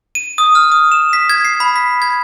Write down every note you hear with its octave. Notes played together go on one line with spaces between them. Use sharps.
D#7
D#6
F6
D#6
E7
B6
G#6
C7
B5
B6
G#6